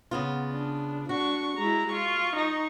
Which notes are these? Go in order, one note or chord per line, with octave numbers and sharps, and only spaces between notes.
C#3 B3 F4
D4
D4 F#4 C#6
G#3 E4 A#5
F4 C#6
D#4